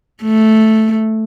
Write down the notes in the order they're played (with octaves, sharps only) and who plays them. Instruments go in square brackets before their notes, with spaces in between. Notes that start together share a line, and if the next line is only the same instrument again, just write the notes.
[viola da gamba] A3